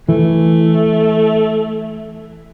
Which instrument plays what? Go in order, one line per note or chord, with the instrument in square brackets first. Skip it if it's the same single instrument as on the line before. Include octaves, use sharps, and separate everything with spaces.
[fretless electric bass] E3 [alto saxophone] A3